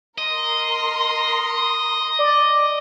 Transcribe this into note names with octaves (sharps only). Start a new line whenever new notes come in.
A#4 D#5 C6
D5